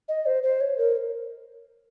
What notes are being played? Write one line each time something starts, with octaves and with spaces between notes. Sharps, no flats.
D#5
C5
C5
C#5
A#4